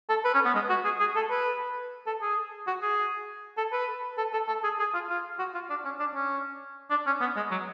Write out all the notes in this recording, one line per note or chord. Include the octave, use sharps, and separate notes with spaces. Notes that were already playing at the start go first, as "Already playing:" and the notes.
A4
B4
C#4
B3
G#3
F#4
G#4
G#4
A4
B4
A4
G#4
F#4
G#4
A4
B4
A4
A4
A4
G#4
G#4
F4
F4
F#4
F4
D4
C#4
D4
C#4
D4
C#4
B3
G#3
F#3